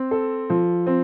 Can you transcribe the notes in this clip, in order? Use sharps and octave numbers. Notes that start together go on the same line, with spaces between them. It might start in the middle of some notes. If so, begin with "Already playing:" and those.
Already playing: C4
A4
F3
C4